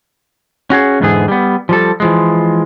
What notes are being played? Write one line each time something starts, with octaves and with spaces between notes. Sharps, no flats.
C#4 F#4 G#4 C#5
E2 G#2 D3 E3 B3 G#4
G3 B3
F3 G3 A4
E3 F3 G#3